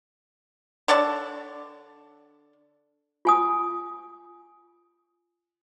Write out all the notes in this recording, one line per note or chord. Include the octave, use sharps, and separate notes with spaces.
D3 C#5 D5 A5
F4 G#5 D#6